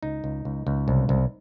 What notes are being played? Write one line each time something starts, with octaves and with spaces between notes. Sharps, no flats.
C#2 D#4
C#2
C#2
C#2
C2
C2